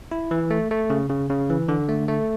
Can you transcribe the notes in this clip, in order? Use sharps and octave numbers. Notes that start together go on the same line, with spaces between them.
E4
E3
A3
A3
C#3
C#3
C#3
E3
D3
A3
A3